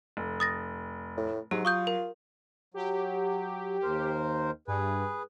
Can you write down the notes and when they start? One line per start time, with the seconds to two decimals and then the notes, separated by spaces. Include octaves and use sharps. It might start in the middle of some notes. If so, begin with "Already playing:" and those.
0.17 F1
0.40 D#6 A6 A#6
1.17 A2
1.51 G#2 F#3 G4
1.65 F4 C#6 D#6 G6
1.87 A#4
2.74 F#3 G4
3.82 D#2 A#4 C5
4.68 G2 G#4 B4